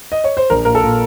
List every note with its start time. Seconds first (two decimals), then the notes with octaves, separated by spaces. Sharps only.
0.12 D#5
0.24 C#5
0.37 C5
0.50 A#1 A#4
0.65 A#2 A#4
0.75 A4
0.84 A#2